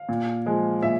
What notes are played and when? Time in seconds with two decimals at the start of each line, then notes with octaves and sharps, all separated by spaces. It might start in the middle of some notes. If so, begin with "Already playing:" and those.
Already playing: F5
0.09 A#2
0.46 F3 G#3
0.83 A#2 E5